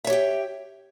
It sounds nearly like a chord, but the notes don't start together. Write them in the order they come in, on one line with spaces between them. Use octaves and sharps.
E5 C#5 G4 G5